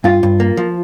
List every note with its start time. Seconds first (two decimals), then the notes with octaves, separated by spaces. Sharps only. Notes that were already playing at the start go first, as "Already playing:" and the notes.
0.04 G2 F4
0.23 G2
0.40 A#3
0.57 F3